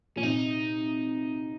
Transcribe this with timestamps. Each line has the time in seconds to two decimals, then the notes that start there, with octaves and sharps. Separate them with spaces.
0.16 A#2 C#4
0.23 C3 D#4